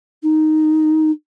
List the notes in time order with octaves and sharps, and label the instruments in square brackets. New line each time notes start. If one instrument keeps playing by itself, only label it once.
[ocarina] D#4